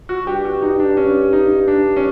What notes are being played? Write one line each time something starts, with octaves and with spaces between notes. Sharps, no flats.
F#4
G2 G4
F#4
D#4
D4
C#4
D#4
D4
C#4